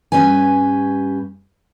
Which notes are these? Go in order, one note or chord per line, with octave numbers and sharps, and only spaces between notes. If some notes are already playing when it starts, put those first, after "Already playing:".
G2 C#4 G4 B4 G#5